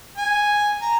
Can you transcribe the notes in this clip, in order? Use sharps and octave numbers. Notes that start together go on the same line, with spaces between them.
G#5
A#5